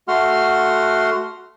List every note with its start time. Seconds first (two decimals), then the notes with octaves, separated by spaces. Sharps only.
0.08 A3 F#4 F#5 C6 F6